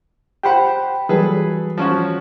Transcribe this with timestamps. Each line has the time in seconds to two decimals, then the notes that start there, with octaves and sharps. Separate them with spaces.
0.43 G4 C5 F#5 G5 B5
1.09 E3 F#3 G3 G#4 A4 B4
1.78 F3 C#4 F#4